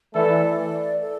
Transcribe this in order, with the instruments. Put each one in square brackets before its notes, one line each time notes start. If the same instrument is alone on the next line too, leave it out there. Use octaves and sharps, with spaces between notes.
[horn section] E3 A3 E4 A4 [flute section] D5
[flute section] A4